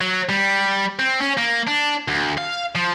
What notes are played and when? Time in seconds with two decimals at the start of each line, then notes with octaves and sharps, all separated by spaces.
0.01 F#3
0.29 G3
0.99 C4
1.20 C#4
1.37 A#3
1.67 D4
2.08 D2
2.38 F5
2.75 F3